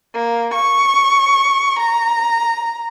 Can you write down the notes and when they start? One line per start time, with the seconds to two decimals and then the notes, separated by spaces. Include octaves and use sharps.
0.14 A#3
0.54 C#6
1.79 A#5